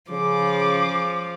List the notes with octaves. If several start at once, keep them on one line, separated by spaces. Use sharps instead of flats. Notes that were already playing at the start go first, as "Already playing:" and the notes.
C#3 F3 D6